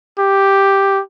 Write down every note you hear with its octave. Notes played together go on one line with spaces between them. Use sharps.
G4